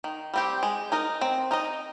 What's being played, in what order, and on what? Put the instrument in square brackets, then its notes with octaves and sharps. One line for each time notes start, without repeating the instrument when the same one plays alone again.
[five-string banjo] D#3
G3 C4 G4
G#3
D#4 A#4 D#5
C4
D#4 A#4 D#5